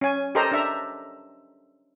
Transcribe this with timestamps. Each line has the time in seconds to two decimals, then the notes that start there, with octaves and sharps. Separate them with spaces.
0.01 C#4 G#5
0.35 G4 A4 A#4 C5 D#5 A#5
0.52 D4 E5 A#5